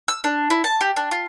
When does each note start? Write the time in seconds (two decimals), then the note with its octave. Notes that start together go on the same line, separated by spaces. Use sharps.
0.08 E6
0.24 D4
0.50 E4
0.64 A5
0.81 G4
0.96 D4
1.11 F4